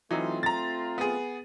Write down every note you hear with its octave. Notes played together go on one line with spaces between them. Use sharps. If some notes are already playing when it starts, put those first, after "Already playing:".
E3 F#3 A3 C4 D#4 F4
A#5 A6
B3 G#4